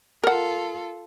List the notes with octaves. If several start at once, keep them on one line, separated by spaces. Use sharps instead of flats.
F4 A4 A#4 F#5